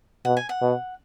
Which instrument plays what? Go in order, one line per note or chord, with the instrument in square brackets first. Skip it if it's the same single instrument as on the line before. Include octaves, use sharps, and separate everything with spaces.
[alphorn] B2 [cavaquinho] F#5
[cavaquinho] G#5
F#5
[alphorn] B2